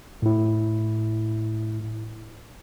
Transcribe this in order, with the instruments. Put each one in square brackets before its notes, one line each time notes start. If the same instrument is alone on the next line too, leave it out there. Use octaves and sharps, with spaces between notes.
[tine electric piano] A2 E4